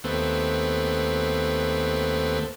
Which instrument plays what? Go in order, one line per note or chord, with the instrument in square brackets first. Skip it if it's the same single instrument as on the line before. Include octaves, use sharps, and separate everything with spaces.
[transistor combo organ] D#2 A3 B3 C4